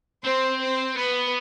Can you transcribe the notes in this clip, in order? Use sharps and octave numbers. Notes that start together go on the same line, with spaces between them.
C4 C5
C5
B3 B4